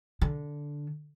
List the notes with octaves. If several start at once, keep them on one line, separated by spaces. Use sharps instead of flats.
D3